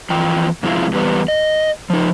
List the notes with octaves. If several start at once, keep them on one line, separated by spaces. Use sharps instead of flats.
F2 E3 F4 G5
G#2 C3 F3 G#3 E4 F4
E2 G3 B3
D#5
F3 D#4